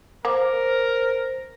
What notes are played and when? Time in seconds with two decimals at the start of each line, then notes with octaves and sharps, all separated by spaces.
0.25 A#3 A#4 C5